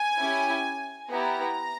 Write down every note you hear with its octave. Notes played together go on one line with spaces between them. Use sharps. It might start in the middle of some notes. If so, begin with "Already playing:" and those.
Already playing: G#5
C#4 E4 G4
B3 E4 G4 A#5